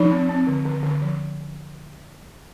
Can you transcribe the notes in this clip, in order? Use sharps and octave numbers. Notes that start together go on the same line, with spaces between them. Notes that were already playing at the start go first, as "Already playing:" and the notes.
Already playing: F3 D#4
C4
C4
D3
D3
D3
F3